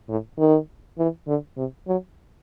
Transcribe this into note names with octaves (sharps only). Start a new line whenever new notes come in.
A2
D#3
E3
D3
C3
F#3